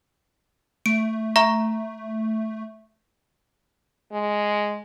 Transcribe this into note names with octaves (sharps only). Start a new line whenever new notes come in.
A3 D7
E5 A#5 C#6
G#3